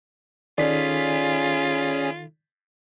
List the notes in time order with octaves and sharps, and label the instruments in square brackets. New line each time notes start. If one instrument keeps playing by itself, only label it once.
[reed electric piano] D#3 D#4 A4 [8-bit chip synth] C#4 G#4 [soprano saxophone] F4 [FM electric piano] D5 B6